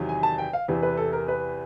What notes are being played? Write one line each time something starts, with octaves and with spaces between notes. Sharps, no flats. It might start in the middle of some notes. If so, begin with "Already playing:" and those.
Already playing: E2 C3 D#3 F#3
G#5
A5
G5
F5
E2 C3 E3
B4
A4
A#4
B4